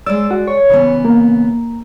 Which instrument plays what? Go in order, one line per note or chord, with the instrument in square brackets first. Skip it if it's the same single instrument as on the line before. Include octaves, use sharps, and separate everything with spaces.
[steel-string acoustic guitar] G#3 D5 [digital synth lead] E6
[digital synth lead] F#4
C#5
[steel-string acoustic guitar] C#3 E3 B3
[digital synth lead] A#3